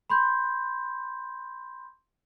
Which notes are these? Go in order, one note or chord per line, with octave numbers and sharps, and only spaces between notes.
B5 C6 G6